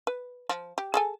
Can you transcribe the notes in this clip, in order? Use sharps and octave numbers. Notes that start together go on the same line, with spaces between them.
B4
F3
G4
G#4 A4 G#5